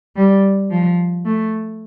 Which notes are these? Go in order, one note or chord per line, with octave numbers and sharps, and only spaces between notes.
G3
F3
A3